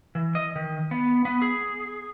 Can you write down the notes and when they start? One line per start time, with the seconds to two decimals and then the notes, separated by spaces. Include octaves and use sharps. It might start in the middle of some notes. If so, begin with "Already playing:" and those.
0.15 E3
0.35 D#5
0.56 D#3
0.91 B3
1.25 B3
1.42 G#4